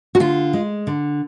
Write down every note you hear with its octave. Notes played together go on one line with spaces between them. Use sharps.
F#4
D3 F4
G#3
D3